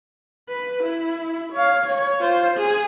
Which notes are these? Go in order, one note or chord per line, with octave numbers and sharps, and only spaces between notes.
B4
E4
C#5 F5
C#5
F4 C5
G#4